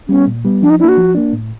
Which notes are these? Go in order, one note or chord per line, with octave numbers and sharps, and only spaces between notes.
G3 B3 C#4
A#2
G3 B3
F3 D4
D#4
A#3 D4 E4 F#4
F3
A#3 D4
A2